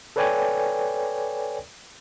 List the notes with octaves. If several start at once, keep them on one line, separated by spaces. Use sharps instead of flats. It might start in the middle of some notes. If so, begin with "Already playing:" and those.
A4 B4 C#5 D5 G5 G#5